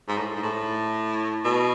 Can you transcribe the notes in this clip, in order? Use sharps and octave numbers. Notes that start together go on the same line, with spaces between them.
G#2
A2
G#2
A2
B2